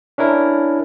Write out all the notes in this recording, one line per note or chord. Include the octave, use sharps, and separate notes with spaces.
C#4 D4 E4 A#4